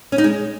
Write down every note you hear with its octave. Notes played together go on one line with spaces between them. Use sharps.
C#4
D#4
G#3